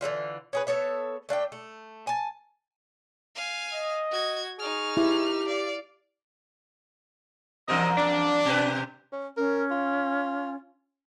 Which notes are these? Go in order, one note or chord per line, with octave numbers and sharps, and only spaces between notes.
D3 E3 G3 F4
C#4 G#4 B4
B3 A4 C#5 E5
A3 D4 F5 G5
A3
G#5 A5
F5 G#5
D#5
F#4 G#6
D#4 G#4 C#6 F6
E4 G4
D5 F5
E2 G2 C3 A#4 D#5
D4
B2 G4 B4
C#4
C#4 A#4
F4